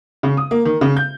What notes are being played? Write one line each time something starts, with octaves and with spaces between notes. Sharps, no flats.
C#3
D#6
A#3
D#3
C#3
G6